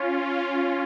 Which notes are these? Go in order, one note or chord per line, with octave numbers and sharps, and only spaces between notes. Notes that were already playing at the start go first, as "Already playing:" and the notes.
Already playing: C#4 F4